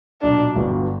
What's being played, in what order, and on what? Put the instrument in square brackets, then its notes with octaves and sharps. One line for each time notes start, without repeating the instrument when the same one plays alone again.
[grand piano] B1 A#2 F#3 [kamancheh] D4
[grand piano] G1 G2 D3 F#3 B3